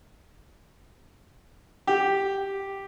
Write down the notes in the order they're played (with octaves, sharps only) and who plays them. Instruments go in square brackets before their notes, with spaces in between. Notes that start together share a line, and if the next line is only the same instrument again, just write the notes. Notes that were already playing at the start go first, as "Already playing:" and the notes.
[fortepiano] G4